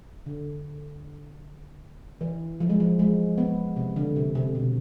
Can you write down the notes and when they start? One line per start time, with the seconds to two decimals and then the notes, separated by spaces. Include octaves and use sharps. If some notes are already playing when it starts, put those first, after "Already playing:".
0.26 D3
2.21 E3
2.60 F3
2.70 G#3
2.80 F3
2.99 G#3
3.38 B3
3.76 C3
3.96 D3
4.16 C3
4.35 C3
4.55 B2